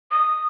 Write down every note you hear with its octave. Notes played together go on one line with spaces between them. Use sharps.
D#6